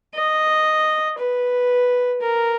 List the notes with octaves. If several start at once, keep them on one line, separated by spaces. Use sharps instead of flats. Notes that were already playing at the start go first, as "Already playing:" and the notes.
D#5
B4
A#4